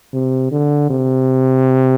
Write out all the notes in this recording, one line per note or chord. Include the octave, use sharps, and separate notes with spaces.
C3
D3
C3